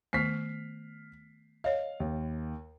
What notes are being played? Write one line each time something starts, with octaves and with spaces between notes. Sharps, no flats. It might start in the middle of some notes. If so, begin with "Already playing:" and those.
D#3 A3 B3 F6 B6 C7
C#5 D#5 F5
D#2